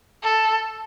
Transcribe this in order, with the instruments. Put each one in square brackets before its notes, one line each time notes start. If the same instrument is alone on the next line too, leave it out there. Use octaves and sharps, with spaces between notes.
[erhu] A4